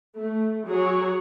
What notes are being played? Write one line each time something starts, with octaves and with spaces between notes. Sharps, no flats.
A3
F#3 G#4 C#5